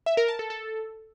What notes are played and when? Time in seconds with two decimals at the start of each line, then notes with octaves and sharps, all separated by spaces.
0.06 E5
0.17 A#4
0.28 A5
0.39 A4
0.50 A4